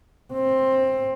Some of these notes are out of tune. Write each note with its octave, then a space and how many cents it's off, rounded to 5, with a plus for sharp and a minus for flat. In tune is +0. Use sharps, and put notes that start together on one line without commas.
C4 +15